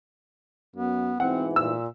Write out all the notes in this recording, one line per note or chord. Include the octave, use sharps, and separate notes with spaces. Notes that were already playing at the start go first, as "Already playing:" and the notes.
F#2 B3
G#2 B2 E3 C4 F#5
A#2 E6